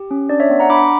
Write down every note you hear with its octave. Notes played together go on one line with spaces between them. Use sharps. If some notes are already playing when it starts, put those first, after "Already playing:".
Already playing: G4
C#4
D4 D5
C#5 E5
B3
F#5 A#5
D4 B5 D6